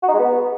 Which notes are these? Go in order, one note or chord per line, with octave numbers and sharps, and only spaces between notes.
F#4
D#4
G#3
B3